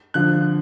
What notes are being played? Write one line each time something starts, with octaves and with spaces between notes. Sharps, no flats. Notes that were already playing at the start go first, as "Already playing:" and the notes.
D3 F3 F#6